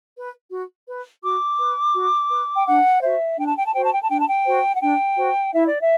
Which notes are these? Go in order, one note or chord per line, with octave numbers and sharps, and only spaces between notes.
B4
F#4
B4
F#4 D6
B4
F#4
B4
G5
D4 F#5
F#4 C5 E5
D4 G5
A5
G5
A5
F#4 C5 G5
A5
G5
A5
D4 G5
A5
G5
F#4 C5
F#5
D4 G5
F#4 C5
E4 E5
D5
E5